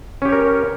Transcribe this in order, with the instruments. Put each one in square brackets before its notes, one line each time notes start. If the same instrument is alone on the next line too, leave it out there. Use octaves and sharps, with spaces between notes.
[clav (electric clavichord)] C#4
G4
C#5
A#4